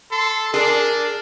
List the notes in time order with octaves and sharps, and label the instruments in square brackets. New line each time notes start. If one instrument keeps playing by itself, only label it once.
[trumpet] A4 [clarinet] C6
[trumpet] D4 [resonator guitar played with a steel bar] G#4 [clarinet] A#4